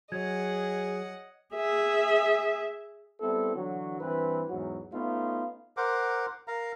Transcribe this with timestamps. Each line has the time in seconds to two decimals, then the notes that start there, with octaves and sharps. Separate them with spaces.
0.12 F#3 G#4 C#5 D#5 F#5 G#6
1.54 G#4 E5
3.20 G3 B3 C4 E4 A4
3.55 D3 E3 F#3
4.01 G2 E3 C4 B4
4.49 E2 G#2 F#3
4.92 A3 B3 C#4 D#4 F4
5.77 A#4 C5 F#5 D6
6.48 A#4 F5 A#5